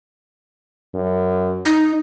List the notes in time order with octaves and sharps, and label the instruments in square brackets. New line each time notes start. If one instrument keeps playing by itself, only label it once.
[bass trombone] F#2
[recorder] D#4